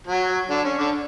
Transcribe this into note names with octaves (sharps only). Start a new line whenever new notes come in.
F#3 F#4
D3 D4
C#4
D3 D4